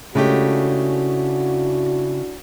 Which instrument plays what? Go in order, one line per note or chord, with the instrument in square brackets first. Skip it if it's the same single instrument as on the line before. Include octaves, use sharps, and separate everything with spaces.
[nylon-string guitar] C#3 [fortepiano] G#3 A3 G4 [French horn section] D4 E4 F#4